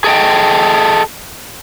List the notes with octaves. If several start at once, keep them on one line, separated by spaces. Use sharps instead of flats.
G#4 A4 D#5 G5